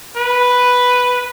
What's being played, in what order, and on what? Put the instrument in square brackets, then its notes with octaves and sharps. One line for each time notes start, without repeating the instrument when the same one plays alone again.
[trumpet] B4